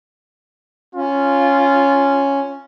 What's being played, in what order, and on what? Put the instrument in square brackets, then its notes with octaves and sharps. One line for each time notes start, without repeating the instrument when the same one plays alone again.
[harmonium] C#4 [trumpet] F4